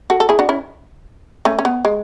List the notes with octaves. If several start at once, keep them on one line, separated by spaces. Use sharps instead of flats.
F#4 A4
A4
E4 G#4
D4 F#4
C#4 E4
A3 C#4
C#4
B3
G#3